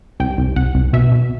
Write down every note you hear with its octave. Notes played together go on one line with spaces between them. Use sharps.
C2 G5
C2
C2 F#5
C2
B2 E5
B2